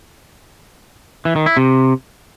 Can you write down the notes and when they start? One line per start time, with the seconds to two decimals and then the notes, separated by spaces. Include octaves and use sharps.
1.25 E3
1.36 D#3
1.46 E4
1.57 C3